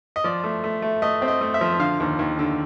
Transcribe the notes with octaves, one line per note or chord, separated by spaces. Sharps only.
D#5
F3 D5
A3
A3
A3
A3 D#5
C4
D#5
A3
E5
F3
D3 F5
D#2
D#2
D3